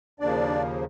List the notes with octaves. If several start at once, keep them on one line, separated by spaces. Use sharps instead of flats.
D#2 C#3 F3 A#3 D4 D5